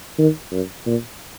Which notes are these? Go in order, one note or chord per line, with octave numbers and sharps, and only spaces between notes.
D#3
F#2
A#2